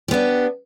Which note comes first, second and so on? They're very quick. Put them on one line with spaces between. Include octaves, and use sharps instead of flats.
G4 B3 D4